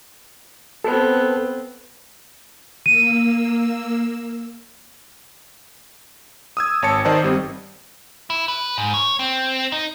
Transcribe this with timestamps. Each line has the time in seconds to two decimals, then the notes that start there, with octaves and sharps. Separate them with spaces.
0.84 B3 C4 A4 B4
2.86 A#3 E6 D#7
6.57 D#6 E6 G#6
6.82 G#1 C#5 A5 C#7
7.05 D#3 D#4 C5 D5 A5
7.23 G1 G3 C4
8.30 E4
8.48 B4
8.78 G#2
8.94 C#5
9.19 C4
9.72 D#4